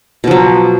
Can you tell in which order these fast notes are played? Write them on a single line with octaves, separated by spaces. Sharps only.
B2 F3 F#3